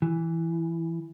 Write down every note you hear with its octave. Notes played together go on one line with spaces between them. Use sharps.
E3